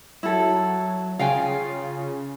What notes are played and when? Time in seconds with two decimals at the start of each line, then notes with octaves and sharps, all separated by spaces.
0.23 F#3 E4 A4
1.19 C#3 F4 F5 G5 G#5